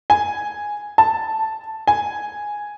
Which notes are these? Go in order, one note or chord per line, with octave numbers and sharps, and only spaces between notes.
G#5
A5
G#5